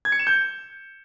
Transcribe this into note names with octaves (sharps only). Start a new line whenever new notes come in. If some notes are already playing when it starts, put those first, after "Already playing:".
G#6
C#7
E7
G6